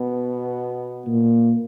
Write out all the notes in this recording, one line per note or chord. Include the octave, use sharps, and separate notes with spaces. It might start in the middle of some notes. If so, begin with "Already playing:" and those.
Already playing: B2 B3
A#2 A#3